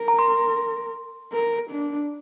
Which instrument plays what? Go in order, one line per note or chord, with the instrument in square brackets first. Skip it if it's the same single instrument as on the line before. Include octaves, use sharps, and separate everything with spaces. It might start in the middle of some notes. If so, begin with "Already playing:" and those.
Already playing: [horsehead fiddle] A#4
[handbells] A#5
C6
[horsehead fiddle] A#4
D4